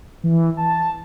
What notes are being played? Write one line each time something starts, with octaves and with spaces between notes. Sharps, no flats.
E3
A5